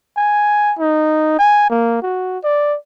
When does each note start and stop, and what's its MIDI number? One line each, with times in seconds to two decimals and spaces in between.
0.16 0.74 80
0.79 1.35 63
1.39 1.68 80
1.70 2.02 58
2.02 2.38 66
2.44 2.77 74